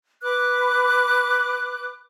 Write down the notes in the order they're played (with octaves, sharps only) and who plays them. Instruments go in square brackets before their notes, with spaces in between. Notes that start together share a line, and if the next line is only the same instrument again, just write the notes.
[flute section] B4 D6 F#6